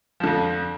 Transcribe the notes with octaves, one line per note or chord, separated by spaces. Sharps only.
F2 D3 F3